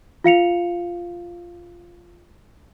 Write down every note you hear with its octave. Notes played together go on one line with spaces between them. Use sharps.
F4 F5 C#7 F7